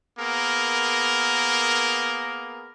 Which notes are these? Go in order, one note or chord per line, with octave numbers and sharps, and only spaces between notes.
A#3 B3 G#4 A#4